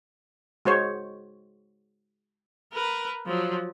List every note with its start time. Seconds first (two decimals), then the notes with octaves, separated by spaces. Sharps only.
0.65 G#3 F#4 C5 C#5
2.73 A#4 B4
3.26 F3 F#3